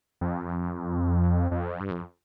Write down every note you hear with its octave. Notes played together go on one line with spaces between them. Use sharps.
F2
F2
G2
F2